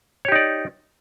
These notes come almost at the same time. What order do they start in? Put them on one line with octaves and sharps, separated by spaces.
C#5 G4 D#4 D5